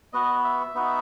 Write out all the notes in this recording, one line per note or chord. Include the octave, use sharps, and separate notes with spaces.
B3 F#4 D#5
E5
B3 D#4 F#4